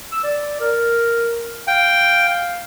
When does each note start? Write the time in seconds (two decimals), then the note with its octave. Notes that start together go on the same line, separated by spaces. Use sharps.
0.12 E6
0.24 D5
0.61 A#4
1.67 F5 G5